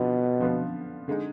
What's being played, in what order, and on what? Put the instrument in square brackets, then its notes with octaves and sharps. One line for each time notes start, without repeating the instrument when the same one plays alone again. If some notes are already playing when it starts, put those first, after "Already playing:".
Already playing: [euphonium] B2 [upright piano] D3 F3 B3 F4
[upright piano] D3 F3 B3 F4 B4
D3 G#3 D#4 G#4